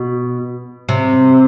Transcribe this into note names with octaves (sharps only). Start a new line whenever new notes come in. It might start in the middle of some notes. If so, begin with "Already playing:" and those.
Already playing: B2
C3